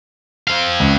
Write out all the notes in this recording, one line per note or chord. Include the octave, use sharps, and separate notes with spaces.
C4 F5
C#2